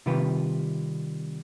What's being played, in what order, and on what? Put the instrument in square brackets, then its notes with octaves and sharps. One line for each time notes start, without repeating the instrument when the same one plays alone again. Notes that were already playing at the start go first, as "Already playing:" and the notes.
[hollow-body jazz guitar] C3 D#3 G3 F4 B4